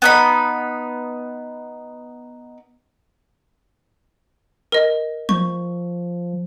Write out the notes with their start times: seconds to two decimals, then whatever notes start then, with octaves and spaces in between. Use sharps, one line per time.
0.02 B3 D#4 B5
4.72 A#4 D#5
5.29 F3 C#6